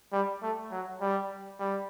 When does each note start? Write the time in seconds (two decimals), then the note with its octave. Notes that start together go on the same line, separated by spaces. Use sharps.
0.12 G3
0.42 A3
0.71 F#3
1.01 G3
1.60 G3